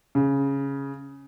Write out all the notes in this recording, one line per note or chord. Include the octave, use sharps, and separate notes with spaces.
C#3